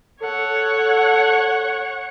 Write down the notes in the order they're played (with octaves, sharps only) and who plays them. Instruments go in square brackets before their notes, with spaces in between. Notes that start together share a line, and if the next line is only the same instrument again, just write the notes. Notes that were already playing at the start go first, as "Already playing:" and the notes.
[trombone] A4 [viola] C#5 F#5